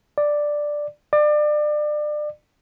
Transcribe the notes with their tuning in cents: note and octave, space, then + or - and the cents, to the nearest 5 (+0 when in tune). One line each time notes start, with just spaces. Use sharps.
D5 +5
D5 +30